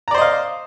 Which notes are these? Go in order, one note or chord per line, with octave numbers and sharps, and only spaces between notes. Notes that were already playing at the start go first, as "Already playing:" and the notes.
C5 D5 D#5 F5 A#5